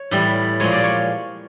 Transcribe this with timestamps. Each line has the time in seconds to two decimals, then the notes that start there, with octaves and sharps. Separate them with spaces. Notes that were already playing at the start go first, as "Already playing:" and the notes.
Already playing: C#5
0.11 A2 E3 G3
0.60 A#2 F3 G#3 C#5
0.72 D5
0.84 C#5